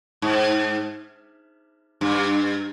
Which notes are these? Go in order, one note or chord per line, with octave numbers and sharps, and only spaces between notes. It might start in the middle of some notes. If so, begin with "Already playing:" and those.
G#2
G2